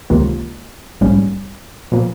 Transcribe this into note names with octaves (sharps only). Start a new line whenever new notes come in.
C#2 C3 D#3 A#3 F4
A#1 G#2 G3 C#4
A#2 F3 A#3